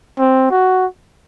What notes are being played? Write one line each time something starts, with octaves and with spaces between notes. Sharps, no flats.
C4
F#4